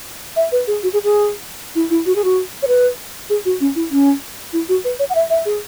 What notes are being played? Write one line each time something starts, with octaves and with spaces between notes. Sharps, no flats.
E5
B4
G#4
F#4
G#4
G#4
E4
E4
F#4
G#4
F#4
C#5
B4
G#4
F#4
C#4
E4
C#4
E4
F#4
B4
C#5
F#5
E5
E5
G#4